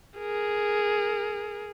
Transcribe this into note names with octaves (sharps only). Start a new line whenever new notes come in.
G#4 A#4